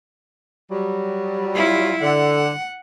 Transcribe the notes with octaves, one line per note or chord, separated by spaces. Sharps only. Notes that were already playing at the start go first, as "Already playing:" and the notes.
F#3 G3
E4 F4
D3 F#5